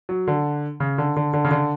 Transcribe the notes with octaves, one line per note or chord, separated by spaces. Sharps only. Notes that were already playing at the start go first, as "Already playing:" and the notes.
F#3
D3
C#3
D3
D3
D3
C#3
D3